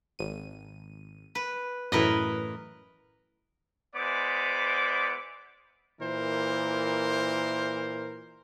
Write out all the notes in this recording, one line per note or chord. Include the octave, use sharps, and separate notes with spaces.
G#1 D#7
B4
F#2 A2 E3 A#4 B4 D#5
G#3 B3 E4 C5 D5 D6
A#2 E3 A#4 C5